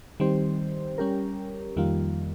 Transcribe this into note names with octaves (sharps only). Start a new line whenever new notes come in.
D#3 G3 C4 G4 C5
G3 C#4 G4 A#4
F2 D#3 G3 A#3 F4